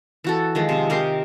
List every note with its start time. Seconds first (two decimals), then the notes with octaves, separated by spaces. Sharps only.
0.24 E3 F#4 A4
0.55 D#3 F3 G#3
0.69 C3
0.90 G4 A#4 D#5 C6